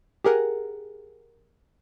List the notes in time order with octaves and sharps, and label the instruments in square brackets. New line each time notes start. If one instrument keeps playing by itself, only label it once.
[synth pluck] G4 G#4 A#4 F#5